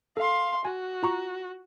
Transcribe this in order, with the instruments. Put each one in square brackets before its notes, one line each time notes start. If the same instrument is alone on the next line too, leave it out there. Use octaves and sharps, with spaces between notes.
[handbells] A4 [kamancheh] F5 C6
[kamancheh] F#4 [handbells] G#5
[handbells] F4 A#5 C#6